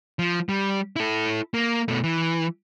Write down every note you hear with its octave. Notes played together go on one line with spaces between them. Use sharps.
F3
G3
E4 A4
A#3
B2 A3
E3